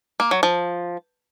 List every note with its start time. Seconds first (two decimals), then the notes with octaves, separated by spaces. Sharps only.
0.20 A#3
0.31 F#3
0.43 F3